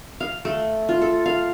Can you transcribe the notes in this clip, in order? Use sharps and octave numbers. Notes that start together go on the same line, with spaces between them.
F5
A3
F4
A4
F5